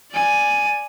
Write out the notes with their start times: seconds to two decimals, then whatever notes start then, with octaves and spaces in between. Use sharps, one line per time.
0.12 D5 G#5